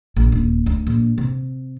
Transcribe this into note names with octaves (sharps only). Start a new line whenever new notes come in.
A#1
D#1
D2
A#1
C3